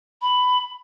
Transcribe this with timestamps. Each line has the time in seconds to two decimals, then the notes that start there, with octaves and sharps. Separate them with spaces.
0.22 B5